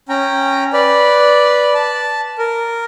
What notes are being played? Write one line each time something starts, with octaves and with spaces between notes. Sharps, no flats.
C#4 G5 A#5
B4 D5
A5
A#4